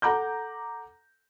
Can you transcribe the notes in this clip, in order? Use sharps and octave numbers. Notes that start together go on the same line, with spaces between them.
A4 F#5 A#5 D6 G6